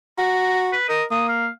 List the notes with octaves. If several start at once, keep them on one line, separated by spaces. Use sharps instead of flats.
F#4 A#5
B4
A#4 D#5
A#3 D#6
F5